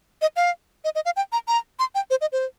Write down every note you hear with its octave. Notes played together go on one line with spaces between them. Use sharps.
D#5
F5
D#5
D#5
F5
G5
A#5
A#5
C6
G5
C5
D#5
C5